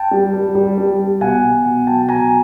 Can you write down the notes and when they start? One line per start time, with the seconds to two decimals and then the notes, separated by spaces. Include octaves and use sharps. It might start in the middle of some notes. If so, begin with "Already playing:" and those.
Already playing: G5 A5
0.11 G3
0.34 G3
0.55 G3
0.78 G3
0.99 G3
1.21 B2 F#5 G#5
1.43 B2
1.65 B2
1.87 F#3 G5 A5
2.09 B2 G#5 A#5